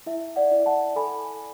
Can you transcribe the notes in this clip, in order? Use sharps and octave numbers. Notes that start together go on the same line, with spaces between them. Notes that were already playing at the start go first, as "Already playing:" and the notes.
E4 E5
D5 F#5
E4
F#5 A5
A4 G#5 B5